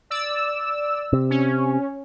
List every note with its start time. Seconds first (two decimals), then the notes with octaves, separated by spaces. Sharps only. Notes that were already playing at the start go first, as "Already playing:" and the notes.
0.10 D5 E6
1.13 C3
1.30 C#4